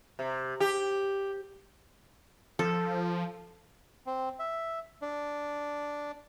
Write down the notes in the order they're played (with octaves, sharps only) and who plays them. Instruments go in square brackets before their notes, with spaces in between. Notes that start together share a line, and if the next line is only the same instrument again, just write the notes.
[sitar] C3
G4
[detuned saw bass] F3 [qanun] A4
[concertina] C4
E5
D4